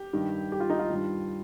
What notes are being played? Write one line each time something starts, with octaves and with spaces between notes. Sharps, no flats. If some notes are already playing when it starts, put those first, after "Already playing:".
Already playing: G4
G2 D#3
G4
F4
D#4
F4
G2 D#3